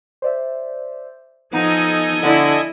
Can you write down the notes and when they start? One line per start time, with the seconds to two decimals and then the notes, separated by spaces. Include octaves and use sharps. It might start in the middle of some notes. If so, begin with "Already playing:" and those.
0.22 C5 D5 E5
1.53 F3 B3 D#4 A4 D#5 F#5 G#5 A#5
2.23 D3 E4